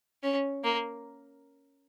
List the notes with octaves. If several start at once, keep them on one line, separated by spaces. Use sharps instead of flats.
C#4
A#3